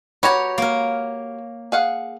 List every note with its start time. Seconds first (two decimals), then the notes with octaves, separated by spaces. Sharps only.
0.23 F#4 G4 B4 C#5 A#5
0.58 A#3 A#4
1.72 G#4 F5 F#5